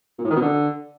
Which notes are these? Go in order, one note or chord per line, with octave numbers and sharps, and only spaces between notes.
A#2
A2
D#3
B2
D3